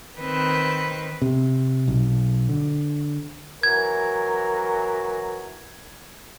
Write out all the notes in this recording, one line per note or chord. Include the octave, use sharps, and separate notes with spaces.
D#3 C4 B4
C3
B1
D3
E3 F#3 A#4 G#6